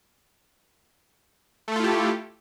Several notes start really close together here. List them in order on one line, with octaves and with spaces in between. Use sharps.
A3 A4 F4 E4 G4